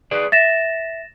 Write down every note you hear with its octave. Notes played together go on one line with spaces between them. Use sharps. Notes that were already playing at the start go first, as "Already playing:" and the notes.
G#4 B4 D5
E5 A6 A#6 E7